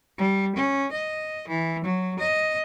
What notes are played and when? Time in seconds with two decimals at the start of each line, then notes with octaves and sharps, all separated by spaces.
0.18 G3
0.56 C#4
0.92 D#5
1.48 E3
1.84 F#3
2.19 D#5